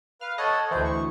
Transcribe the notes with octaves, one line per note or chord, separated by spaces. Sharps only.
B4 F5 F6
A4 C#5 D#5 F#5
D2 E3 C5
C#6